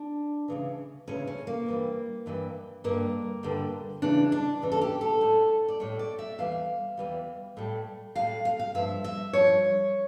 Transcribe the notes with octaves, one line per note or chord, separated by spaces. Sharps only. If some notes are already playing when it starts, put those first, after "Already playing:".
Already playing: D4
D2 C#3 E3
D2 C#3 E3 C#4
C#4
A#3
G2 E3 G3
G2 E3 G3
G2 D3 G3 A#3
G2 D3 G3
E2 C#3 E3 D4
D4
E2 C#3 E3
A4
G4
A4
A2 G3
D5
A2 G3 C#5
D5
E5
E2 E3 G3 F5
E2 E3 G3
A2 G3
A2 G3 F5
F5
F5
G2 F3 E5
E5
G2 F3 C#5